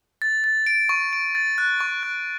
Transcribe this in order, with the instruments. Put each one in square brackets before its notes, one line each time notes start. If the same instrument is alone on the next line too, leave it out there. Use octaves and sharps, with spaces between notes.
[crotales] A6
A6
D7
C#6
D7
A6
F#6
C#6
F#6